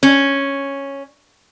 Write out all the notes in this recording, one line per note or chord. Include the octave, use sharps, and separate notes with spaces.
C#4